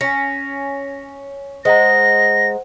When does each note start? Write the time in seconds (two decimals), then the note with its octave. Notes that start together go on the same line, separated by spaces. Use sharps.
0.01 C#4 G#5 A#6
1.65 G#3 C5 F#5 A#5 A#6